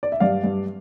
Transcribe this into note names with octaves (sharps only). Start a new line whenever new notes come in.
D5
E5
G2 D5 F5
G2